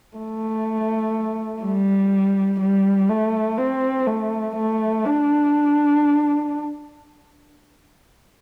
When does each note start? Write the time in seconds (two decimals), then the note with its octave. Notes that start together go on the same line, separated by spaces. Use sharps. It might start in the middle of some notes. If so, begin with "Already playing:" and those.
0.17 A3
1.62 G3
2.60 G3
3.10 A3
3.58 C4
4.07 A3
4.56 A3
5.05 D4